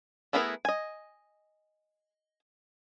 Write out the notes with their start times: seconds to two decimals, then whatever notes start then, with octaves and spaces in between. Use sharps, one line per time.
0.33 A3 B3 E4 G#4 A#4
0.65 D#5 G#5